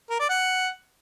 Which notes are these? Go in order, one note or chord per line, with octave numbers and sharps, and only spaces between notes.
A#4
D5
F#5